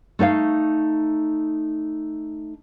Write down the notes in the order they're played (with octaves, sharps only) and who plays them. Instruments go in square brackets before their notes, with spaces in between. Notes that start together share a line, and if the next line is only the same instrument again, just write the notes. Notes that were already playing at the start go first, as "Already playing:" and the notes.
[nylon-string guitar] A3 D#4 C#5 F5